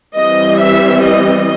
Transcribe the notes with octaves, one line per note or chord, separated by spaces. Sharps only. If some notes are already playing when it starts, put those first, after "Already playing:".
E3 G3 C4 D#5
E5
D#5